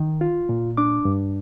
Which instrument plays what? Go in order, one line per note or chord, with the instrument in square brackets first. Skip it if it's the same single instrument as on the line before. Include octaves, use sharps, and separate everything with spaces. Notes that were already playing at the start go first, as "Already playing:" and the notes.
Already playing: [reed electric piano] D#3
F4
A#2
D4 D6
G2